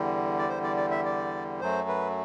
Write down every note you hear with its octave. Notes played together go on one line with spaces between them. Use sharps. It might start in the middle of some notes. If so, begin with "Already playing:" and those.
Already playing: E2 D3 G3
D5
C5
D5
D5
E5
D5
F#2 F#3 A3 C5
B4